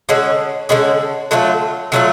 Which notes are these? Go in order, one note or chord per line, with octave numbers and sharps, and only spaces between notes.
D3 G#3 C#4 F#4
D3 G#3 C#4 F#4
D3 F#3 A3 F4
D3 F#3 A3 F4